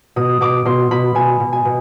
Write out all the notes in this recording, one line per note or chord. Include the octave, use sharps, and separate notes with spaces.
B2 D#6
B2 D6
B2 C6
B2 B5
B2 G#5
B2
G#5
B2